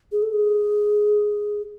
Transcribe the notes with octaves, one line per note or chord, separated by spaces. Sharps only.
G#4
A4
G#4